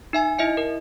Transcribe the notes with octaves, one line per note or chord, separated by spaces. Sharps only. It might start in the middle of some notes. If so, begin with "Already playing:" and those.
D#4 E5 G#5
E4 D#5 E5 C#7
A#4